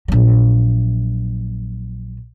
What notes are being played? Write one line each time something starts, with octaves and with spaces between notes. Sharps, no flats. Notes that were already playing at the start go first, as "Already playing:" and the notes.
A#1 F#3